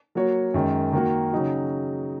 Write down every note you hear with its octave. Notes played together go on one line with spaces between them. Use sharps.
F#3 A#3 F#4 C#5
F#2 D#3 G#3
D#3 A#3 F#4
C#3 F#3 D#4 F#4